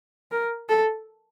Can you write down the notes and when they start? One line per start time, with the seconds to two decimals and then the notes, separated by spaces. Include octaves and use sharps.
0.32 A#4
0.69 A4